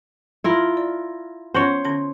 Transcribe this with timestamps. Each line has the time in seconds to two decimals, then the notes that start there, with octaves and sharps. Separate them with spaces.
0.44 E4 F4 A#4
0.77 D5
1.54 B3 C#4 F4 C5 C#5
1.85 D3 C#4 C6